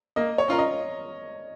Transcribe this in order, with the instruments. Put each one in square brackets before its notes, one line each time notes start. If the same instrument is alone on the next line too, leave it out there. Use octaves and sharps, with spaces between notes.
[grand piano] A#3 [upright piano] D#5
[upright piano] C#5
[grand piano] C#4 F4 A#4
[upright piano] D#5